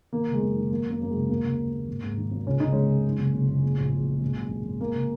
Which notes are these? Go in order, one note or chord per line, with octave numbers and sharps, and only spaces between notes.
D#3 A#3
F#1
G#3
F#2 A#3
D#3
D#3 A#3
F#2 A#3
F#2 A#3
G#3
F#1
D#2 A#3
C#3
D#2
D#2
G#1
G#2
D#3
G#1
C#2 C#4
C#3 D#4
C#3 G#3 C#4
C#3
F#2
F#1
F#1
F#1
A#2
A#1
A#1
A#2
G#1
F#2
G#1
G#1
G#1 A#3
C#3